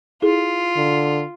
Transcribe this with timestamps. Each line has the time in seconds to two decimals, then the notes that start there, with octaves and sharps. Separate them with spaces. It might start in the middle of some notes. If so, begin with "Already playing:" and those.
0.22 E4 F4 G#4 A4
0.77 D3